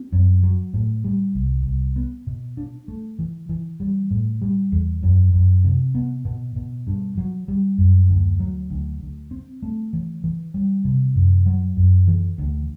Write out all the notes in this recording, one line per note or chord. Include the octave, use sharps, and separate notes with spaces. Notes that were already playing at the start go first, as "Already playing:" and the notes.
Already playing: C4
F#2
F#3
A2
G3
C2
C2
B3
B2
D4
A3
E3
E3
G3
A2
G3
E2
F#2
F#2
C3
B3
B2
B2
G2
F#3
G3
F#2
D2
F#3
D2
D2
C4
A3
E3
E3
G3
C3
F#2
F#3
F#2
E3
D2